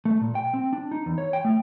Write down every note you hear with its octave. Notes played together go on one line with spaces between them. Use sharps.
A3
A#2
G5
C4
D4
D#4
E2
C#5
G5
A3